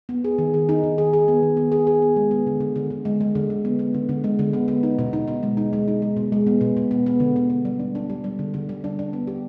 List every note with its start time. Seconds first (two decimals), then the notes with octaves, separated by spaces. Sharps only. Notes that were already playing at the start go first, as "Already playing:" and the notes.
0.09 B3
0.24 G#4
0.38 D#3
0.54 G#4
0.69 D#4
0.84 D#3
0.98 G#4
1.13 G#4
1.28 B3
1.43 D#3
1.57 B3
1.72 G#4
1.87 G#4
2.02 B3
2.16 G#3
2.31 B3
2.47 D3
2.60 D3
2.76 D3
2.90 D3
3.05 G#3
3.21 G#3
3.35 D3
3.50 G#3
3.65 B3
3.79 B3
3.94 D3
4.09 D3
4.24 G#3
4.39 D3
4.53 B3
4.68 B3
4.83 D#4
4.99 B2
5.13 D#4
5.28 B2
5.43 G#3
5.57 D#4
5.73 G#3
5.88 D#4
6.02 G#3
6.17 B2
6.32 G#3
6.47 B3
6.61 B2
6.77 B2
6.91 B3
7.06 B3
7.20 D3
7.36 B3
7.50 B3
7.65 G3
7.80 D4
7.95 D4
8.10 G3
8.24 G3
8.39 D3
8.54 D3
8.69 G3
8.84 D4
8.99 D4
9.13 B3
9.27 G4